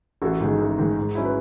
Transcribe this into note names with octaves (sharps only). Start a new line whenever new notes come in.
A1 F#4 A4
G#2 D#3 G#3
A1
G#2 D#3 G#3
G#2
F#3 C#4 E4
B4